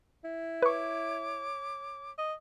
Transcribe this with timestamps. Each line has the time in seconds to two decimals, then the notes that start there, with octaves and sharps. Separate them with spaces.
0.24 E4
0.62 B4 C#5 C#6 D6
2.18 D#5